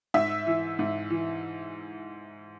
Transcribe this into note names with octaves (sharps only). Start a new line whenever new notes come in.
G#2 E5
E3
G#2
E3